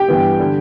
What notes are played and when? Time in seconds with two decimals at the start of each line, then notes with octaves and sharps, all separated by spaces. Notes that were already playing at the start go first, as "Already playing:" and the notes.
Already playing: G4 G5
0.08 G2 E3 B3
0.39 D3 G3